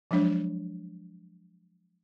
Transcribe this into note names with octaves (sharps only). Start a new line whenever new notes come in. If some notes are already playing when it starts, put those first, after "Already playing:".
F3 F#3 G#3 D4 C#5